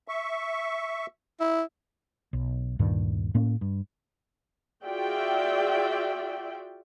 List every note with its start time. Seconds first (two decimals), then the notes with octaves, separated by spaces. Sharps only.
0.08 E5 C#6
1.40 E4
2.33 B1
2.79 D2 G2 A#2 D#3
3.35 A2 A#3 C#4
3.61 G2
4.84 F4 F#4 G#4 D5 E5 G5